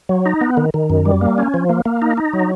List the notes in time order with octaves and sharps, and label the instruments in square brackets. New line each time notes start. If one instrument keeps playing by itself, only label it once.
[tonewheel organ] F#3
D#4
B3
D#3
D#3
F#2
G3
A#3
C#4
F3
A#3
A#3
D#4
D#4
F#3